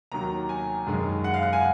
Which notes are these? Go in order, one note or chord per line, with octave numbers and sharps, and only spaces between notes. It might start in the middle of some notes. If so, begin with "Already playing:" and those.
D#2 D#3 F#3 A#5
G#5
F#2 D#3 G#3
F#5
F5
F#5
G#5